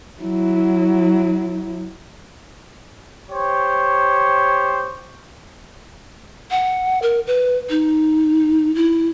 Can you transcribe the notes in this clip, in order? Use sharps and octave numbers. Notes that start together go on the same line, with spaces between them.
F#3 E4
G4 C5 C#5
F#5
A#4
B4
D#4
E4